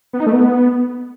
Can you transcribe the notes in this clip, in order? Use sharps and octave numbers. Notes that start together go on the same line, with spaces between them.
B3
D#4
A3
B3